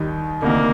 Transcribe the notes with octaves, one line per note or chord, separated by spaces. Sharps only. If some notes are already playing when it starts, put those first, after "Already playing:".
Already playing: D#2 D#3 G3
D2 C3 D#3 A#3